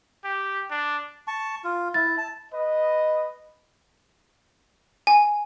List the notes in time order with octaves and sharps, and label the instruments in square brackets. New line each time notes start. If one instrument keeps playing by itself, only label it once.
[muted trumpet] G4
D4
[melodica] A5 C#6
F4
[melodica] E4 [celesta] A6
[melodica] A5
[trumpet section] B4 D#5
[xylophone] G#5